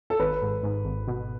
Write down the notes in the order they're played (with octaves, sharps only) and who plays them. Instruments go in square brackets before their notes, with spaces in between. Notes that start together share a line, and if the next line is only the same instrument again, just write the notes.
[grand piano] A4
[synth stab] G#1 [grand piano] B4
[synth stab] G#2
G#2
G#1
B2